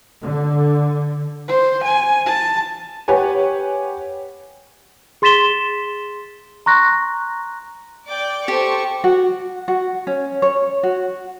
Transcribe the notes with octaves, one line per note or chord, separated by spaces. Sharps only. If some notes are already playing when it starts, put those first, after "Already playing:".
D3
C5
G#5
A5
G4 B4 C#5 F#5 G#5
G#4 C6 A6 B6 E7 G7
A#5 C6 C#6 F#6 A#6
D5 G5 D6
G4 A4 C5 C#6
F#4
F#4
C#4
C#5
F#4